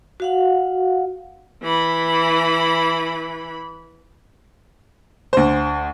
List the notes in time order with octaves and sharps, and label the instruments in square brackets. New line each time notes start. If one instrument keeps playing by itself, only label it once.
[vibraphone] F#4 F5 F#5
[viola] E3 B5
[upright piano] D2 C5